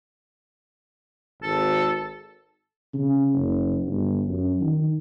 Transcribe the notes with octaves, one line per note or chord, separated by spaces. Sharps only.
G#1 A4
C#3
F#1
G1
F#2
D#3